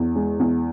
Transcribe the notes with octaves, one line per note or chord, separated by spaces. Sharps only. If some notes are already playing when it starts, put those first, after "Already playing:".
Already playing: E2
G#3
E2